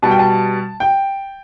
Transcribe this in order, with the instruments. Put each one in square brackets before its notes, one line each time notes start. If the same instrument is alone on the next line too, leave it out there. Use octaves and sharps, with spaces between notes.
[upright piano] B2 G3 A5
G5
A5
G5